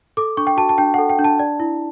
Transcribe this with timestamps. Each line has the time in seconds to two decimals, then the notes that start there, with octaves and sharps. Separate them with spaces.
0.17 A4 D6
0.37 D4 C#6
0.47 G5
0.57 F#4 A5
0.69 A5
0.78 D4 G5
0.94 A4 F#5
1.09 G5
1.19 D4
1.24 A5
1.39 D5
1.60 E4